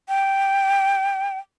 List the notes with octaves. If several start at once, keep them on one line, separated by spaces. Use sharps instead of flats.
G5